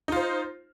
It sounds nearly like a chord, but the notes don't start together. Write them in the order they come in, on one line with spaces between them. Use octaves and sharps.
D#4 F4 C5